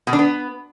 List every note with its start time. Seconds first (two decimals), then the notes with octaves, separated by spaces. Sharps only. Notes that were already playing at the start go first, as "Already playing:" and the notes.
0.07 B2
0.13 D4
0.19 B3